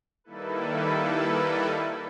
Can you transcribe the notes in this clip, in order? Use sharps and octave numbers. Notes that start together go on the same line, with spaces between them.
D#3 G3 A#3 E4 A4 B4